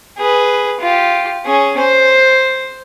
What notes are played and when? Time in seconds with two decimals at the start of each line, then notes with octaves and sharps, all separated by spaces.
0.18 G#4 B4
0.81 F4 G4
1.46 C#4 G#4
1.78 C5